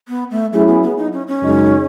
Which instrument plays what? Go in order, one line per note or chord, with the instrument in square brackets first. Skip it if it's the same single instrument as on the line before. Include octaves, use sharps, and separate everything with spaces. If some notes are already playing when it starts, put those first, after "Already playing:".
[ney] B3
A3
[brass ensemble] F#3 C#4 E4 G#4 [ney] A3
[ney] B3
B3
D#4
C#4
C#4
[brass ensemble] F#2 C#3 G#3 D#4